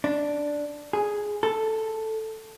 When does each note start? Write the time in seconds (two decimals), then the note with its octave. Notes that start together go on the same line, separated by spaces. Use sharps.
0.04 D4
0.93 G#4
1.43 A4